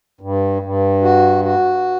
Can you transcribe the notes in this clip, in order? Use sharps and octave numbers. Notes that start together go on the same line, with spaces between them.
G2
G2
F#4
F#4